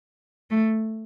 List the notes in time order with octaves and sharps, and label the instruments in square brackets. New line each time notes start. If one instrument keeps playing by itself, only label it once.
[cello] A3